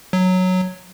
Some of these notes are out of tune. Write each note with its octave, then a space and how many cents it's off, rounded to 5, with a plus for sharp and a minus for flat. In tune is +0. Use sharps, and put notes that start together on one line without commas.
F#3 -5